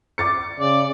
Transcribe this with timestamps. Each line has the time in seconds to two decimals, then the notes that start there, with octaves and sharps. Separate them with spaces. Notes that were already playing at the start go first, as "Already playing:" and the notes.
0.18 D6 A6 C#7
0.60 C#3 D5